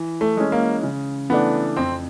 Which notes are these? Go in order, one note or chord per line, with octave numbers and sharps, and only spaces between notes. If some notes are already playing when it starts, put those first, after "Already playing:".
Already playing: E3
A3
G#3 C#4
A#3
C#3
E3 A3 B3 D4
F2 C4